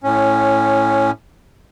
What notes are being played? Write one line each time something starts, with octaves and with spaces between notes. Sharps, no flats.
A2 C#4